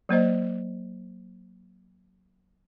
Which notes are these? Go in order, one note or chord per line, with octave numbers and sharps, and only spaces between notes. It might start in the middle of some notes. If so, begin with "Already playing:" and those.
F#3 A#3 C5 D#5